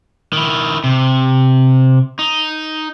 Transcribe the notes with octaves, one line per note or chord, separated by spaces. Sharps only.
D#3 E4
C3
D#4